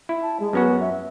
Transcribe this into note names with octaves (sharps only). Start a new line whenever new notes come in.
E4
A5
G#3
F#2 B3 C#4 F#4
E5